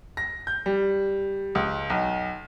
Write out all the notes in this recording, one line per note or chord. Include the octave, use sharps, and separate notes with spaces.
A#6
G6
G3
C#2
B1